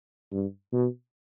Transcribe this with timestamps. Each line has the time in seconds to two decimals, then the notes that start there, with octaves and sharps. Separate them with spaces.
0.32 G2
0.73 B2